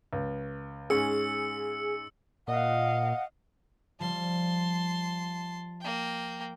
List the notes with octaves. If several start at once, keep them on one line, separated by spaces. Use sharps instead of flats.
C#2
G#2 C#4 G#4 E6 C#7
A#2 D#5 F5 F#5
F3 G3 A5 C6
A#3 G5